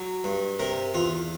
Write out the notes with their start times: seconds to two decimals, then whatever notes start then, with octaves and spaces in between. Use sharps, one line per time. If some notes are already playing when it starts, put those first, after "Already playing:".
Already playing: F#3
0.24 G2
0.59 C3 A#4
0.94 E2 F4